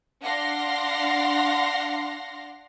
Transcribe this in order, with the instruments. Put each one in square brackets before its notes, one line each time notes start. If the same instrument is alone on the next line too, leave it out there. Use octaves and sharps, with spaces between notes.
[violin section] D4 F5 F#5 C6 A#6